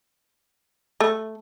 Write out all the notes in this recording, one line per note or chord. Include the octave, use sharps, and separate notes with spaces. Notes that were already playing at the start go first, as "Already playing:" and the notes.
A3